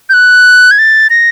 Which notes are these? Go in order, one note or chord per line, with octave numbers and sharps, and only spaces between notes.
G6
F#6
G#6
A6
A#6